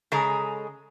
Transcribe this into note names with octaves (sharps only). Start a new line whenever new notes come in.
C#3 G#3 G#4 A4 D#5 A#5